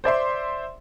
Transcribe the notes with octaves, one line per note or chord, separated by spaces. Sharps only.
C5 D5 E5 C6